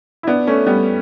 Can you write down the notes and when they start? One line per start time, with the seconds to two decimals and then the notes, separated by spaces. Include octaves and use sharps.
0.23 E4
0.27 B3 D4
0.47 A3 C#4
0.67 G3 B3